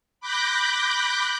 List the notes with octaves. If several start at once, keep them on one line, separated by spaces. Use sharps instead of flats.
B5 D6 F#6 G6 A#6